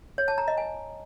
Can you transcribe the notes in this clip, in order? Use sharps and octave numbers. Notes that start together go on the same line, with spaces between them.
C#5
A5
A#5
D#5
G#5